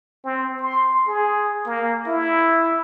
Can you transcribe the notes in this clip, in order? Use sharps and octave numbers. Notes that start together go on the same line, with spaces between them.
C4
C6
G#4
A#3
E4